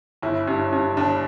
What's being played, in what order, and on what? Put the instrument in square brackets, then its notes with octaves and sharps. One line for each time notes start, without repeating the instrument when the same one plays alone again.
[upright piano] G1 E4
G2
G2
G1 D4